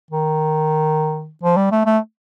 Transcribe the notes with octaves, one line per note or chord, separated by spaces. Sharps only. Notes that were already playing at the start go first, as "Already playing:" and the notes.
D#3
F3
G3
A3
A3